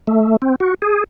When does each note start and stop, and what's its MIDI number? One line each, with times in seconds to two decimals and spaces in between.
0.07 0.36 57
0.42 0.55 60
0.60 0.74 66
0.82 1.04 68